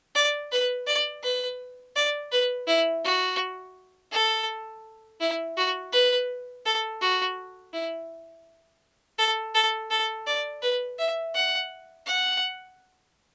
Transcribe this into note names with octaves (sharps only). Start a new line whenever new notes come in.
D5
B4
D5
B4
D5
B4
E4
F#4
A4
E4
F#4
B4
A4
F#4
E4
A4
A4
A4
D5
B4
E5
F#5
F#5